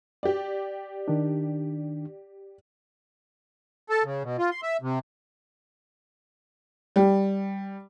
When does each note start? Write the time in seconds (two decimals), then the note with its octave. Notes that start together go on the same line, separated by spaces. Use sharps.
0.23 G4 D5
1.08 D#3 D4
3.90 A4
4.04 C#3
4.23 B2
4.38 F4
4.51 C6
4.63 E5
4.82 C3
6.96 G3